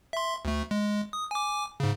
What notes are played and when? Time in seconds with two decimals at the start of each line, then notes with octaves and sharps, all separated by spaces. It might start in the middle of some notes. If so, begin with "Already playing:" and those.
0.13 E5 C6
0.45 D2 A3
0.71 G#3
1.13 D#6
1.31 G#5 D6
1.80 G#2 C#3